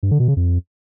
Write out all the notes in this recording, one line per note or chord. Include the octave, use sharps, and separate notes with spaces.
G2
D3
B2
C#3
F2